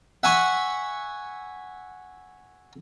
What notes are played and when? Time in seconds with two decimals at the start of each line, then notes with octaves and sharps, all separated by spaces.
0.23 E5 F#5 G#5 B5 C#6